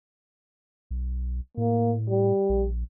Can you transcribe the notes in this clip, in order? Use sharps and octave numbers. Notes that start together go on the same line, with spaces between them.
B1
A2 A#3
G3
A#1